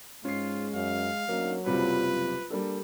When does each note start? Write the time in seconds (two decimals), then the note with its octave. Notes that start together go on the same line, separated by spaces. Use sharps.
0.25 G#2 G#3 C#4 F4 C7
0.74 F#2 F5
1.29 D2 F#3 A#3 C#4 D#4
1.66 F#1 C3 G3 F4 B4
2.50 G3 A#3 D4 A4